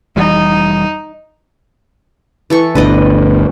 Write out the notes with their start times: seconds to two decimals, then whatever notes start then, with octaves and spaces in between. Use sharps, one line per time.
0.16 F1 E3 G3 D#4
2.50 E3 A4 C#6
2.75 G1 D2 D3 B4 D5 D#5